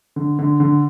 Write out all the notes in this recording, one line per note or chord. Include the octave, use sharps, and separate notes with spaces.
D3
D3
D3